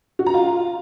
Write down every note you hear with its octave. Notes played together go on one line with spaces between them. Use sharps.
F#4
A#5
F4